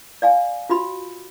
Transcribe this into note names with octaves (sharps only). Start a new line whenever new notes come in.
D5 F5 G#5
F4 F#4 B5